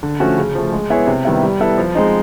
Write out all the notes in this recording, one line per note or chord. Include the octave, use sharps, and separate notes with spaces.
D3
F3 A3 C#4 F#4
C#3
F3 A3
G#3
B3 E4 G#4 C#5
C3
D#3 G3 B3 E4
G3
B3 E4 A4
F3
G#3 C4 D#4